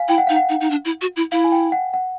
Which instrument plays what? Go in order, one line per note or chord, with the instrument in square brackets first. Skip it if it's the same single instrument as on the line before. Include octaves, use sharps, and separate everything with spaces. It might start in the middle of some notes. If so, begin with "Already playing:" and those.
Already playing: [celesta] F5 G#5
[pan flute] E4 [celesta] G5
[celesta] F#5
[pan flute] D#4 [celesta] F5
[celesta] F#5
[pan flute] D#4
D#4
D4
E4
F#4
E4
[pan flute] E4 [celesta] F5
[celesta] G#5
G5
F#5
F#5